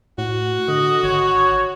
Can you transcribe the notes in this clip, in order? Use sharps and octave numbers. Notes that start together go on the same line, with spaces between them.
A2 F#4
D3 D#5
G#1 C#5